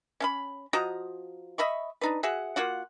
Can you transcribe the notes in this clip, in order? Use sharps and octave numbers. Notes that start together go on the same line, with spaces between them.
C#4 F5 B5
F3 F#4 D#5 A#5
D#5 E5 B5 C#6
D4 D#4 B4
F#4 G#4 E5 F#5
A#3 F4 F#4 F#5